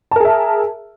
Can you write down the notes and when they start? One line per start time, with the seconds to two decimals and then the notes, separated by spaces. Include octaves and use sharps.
0.11 A5
0.16 A#4
0.20 G#4
0.25 E5